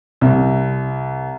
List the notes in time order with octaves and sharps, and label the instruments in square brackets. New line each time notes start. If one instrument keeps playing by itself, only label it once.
[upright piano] C2